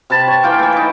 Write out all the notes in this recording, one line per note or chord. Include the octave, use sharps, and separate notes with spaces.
C3 B4 A5 B5
C#5
E3 A#3 F4 G5
E3 A3
D#4 B4